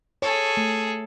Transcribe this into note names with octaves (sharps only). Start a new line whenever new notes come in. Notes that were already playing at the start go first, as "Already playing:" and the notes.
G#4 A4 C#5
A3